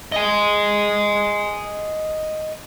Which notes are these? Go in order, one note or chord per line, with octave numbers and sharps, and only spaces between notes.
D#5 G#5